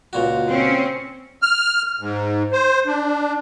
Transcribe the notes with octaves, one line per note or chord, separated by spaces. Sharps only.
C#2 A#2 F#4
C4 C#4
F6
G#2
C5
D4